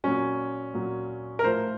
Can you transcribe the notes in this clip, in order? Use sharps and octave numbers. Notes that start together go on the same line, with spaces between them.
A#2 F#3 C#4
A#2 F#3
A#4
A2 F3 C5